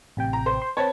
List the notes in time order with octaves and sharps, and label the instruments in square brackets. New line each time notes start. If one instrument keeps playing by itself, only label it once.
[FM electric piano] A1 C3 G5
[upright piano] A#5
C5
[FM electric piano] C6
[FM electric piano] C4 B4 A5 [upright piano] C#5